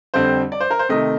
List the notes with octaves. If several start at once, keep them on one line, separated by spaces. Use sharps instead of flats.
F2 D3 G3 C4 C5
D5
C5
A#4
C5
C3 D#3 A3 D#5